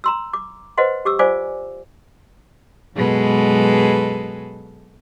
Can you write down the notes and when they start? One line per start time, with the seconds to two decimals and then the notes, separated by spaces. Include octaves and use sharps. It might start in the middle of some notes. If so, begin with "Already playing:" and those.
0.04 A#5 C6 E6
0.33 D6
0.78 B4 C5 D#5 F#5 C6
1.05 G4 D6 E6
1.19 F4 C5 D5 F5 G#5 D6
2.95 F#2 B2 G#3 G#4 A4 B4